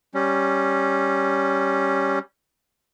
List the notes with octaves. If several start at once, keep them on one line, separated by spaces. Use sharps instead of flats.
G3 C#4